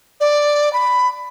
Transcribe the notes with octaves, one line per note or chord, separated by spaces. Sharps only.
D5
B5